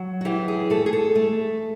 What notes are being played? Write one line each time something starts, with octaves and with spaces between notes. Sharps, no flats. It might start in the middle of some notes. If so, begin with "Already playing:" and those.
Already playing: F#3
F#4
E3 G4
G#4
A3 A4
G#4
A4
A3